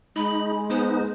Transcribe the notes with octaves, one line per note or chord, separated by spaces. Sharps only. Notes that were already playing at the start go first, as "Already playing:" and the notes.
G#3 D#4 B5
B3 D#4 C5